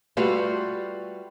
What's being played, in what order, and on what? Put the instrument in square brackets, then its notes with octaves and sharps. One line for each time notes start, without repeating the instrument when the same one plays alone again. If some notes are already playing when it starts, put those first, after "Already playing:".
[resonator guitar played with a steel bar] G3 A3 F4 F#4 B4 F5